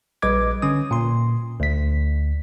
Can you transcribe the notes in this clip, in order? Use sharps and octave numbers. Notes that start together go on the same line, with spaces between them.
A#1 G3 B4 D#5 D6 G#6
D3 C#4 D#6
A#2 C6
D2 B6